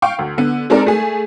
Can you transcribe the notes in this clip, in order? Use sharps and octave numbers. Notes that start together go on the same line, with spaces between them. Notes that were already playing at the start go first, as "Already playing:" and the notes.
F5 G5 C#6
D2
D3 B3
G#3 C4 D#4 A4 A#4 D5
A3 G#4